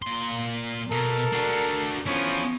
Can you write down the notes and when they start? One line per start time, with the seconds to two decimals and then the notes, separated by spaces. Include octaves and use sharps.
0.02 A#2 C6
0.91 B2 A4 A#4
1.32 D4 F#4
2.06 F3 B3 C#4 E4